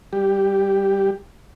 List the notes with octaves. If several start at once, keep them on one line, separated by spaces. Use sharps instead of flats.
G3 G4